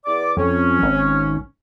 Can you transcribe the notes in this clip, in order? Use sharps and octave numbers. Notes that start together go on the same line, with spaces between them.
E2 D5 D6
F2 C#4
G#1